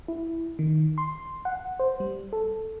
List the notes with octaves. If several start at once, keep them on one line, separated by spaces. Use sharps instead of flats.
E4
D#3
C6
F#5
C5
G3
A4